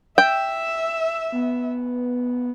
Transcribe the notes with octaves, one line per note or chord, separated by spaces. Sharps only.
E5 G5 E6
B3